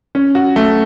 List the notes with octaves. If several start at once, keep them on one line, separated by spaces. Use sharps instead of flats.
C#4
F#4
A3